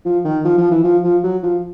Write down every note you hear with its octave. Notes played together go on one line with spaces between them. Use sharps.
F3
D#3
F3
F3
E3
F3
F3
F#3
F3